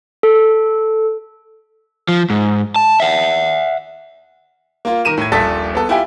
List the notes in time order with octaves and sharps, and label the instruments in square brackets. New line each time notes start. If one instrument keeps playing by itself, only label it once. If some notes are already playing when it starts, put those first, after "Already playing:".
[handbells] A4
[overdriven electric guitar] F3
G#2
A5
E5 F#5
[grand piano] A#3 F4
D#3 A#4 D#7 E7
A2 G#6
D#1 A#1 A4 A6 B6
B3 A4
E4 F4 G4 G5 G#5